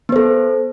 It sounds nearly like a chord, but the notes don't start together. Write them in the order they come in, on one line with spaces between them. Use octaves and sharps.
B3 C5 A4